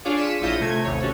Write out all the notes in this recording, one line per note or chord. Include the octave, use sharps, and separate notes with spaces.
D4 F4 G#4 C#5 F5 D6
B6 C#7 D#7 E7
A#1 E4 F4 G6 A#6 D#7
C3 A3 G#6
A1 D#2 C3 C#5
C#4 F#4 A4 C#5